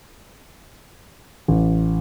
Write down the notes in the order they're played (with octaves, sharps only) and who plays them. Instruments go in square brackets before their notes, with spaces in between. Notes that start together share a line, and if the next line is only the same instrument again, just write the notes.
[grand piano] A1